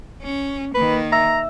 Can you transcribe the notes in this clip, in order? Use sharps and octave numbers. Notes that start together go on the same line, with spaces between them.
C#4
D#3 A#3 B4
E5 A#5 E6